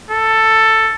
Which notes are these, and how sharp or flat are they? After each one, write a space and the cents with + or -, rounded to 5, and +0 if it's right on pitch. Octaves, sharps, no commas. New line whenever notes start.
A4 +10